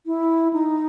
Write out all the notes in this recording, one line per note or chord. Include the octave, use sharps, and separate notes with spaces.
E4
D#4